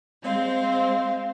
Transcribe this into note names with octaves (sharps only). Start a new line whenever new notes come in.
G#3 C4 C5 F5